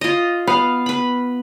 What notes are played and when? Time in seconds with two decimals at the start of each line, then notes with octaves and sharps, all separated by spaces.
0.01 F4 D#5
0.47 B3 F5
0.86 B4 B5